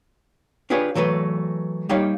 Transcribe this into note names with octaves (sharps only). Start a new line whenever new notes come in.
D4 F4 G4 G#4 B4 C#5
E3 F#3 A3 B4
G3 A#3 D#4 G4 C#5 F5